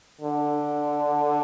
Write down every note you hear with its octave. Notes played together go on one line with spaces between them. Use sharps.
D3